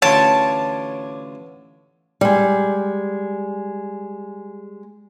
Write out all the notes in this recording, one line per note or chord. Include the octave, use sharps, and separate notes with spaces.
A1 D3 F4 C#5 A5 D6 G#6
G3 G#3